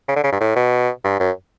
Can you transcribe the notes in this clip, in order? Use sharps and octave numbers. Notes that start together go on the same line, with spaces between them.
C#3
D3
C#3
G2
A2
B2
G2
F#2